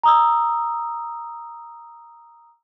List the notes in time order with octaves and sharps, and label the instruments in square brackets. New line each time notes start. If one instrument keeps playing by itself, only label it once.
[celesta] A#5 D#6 E6